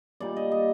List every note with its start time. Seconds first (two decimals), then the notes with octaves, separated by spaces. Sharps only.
0.20 A#2 G3 A#3 D#4 D5
0.36 D#5
0.51 D#5